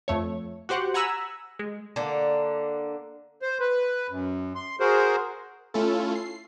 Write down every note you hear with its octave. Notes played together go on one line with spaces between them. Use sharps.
F2 A3 C#5
F#4 G4 C5 F#5
F#5 G#5 A#5 B5 E6
G#3
D3 A#3
C5
B4
F#2
C6
F#4 G#4 A#4 C5
A3 C#4 E4 F4 A4
C7